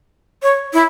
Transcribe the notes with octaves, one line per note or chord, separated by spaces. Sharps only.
C#5
E4